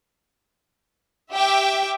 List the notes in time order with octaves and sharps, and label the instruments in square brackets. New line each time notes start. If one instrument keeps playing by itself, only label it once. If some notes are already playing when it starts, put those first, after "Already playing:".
[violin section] G4 E5 G5 D6